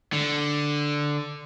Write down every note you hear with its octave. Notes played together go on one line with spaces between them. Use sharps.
D3